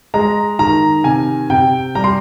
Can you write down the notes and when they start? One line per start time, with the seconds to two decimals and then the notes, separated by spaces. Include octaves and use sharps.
0.14 G#3 A#5
0.59 D#3 A#5
1.04 C3 G#5
1.50 C3 G5
1.95 G3 A#5
2.04 C6